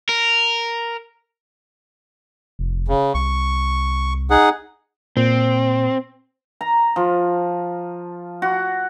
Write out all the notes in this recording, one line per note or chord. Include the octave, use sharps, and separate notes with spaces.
A#4
F1
C#3
C2 C#6
D#4 G#4 F#5
A#2 C4
A#5
F3
F#4